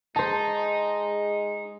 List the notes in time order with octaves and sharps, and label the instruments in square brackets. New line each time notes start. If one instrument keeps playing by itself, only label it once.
[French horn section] G#3 [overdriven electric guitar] D#4 [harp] C5 A5